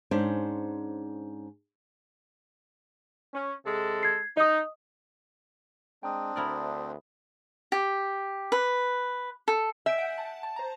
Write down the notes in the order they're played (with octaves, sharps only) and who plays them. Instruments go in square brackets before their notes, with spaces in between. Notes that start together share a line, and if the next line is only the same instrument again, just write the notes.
[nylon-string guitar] G#2 C#4 D4 C5
[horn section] C#4
C3 G#3 A4
[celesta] G#6 C7
[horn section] D#4 [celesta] D#5 D#6
[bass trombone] G#3 [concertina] C4 D4 [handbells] G5 A#5 D#6
[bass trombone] D2 [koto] E4 A#4 D5 [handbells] E5 D#6
[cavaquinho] G4
B4
A4
[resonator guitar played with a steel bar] E5 [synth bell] G#5 G6 D7
[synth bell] F#5
A5
A5
C5 A#5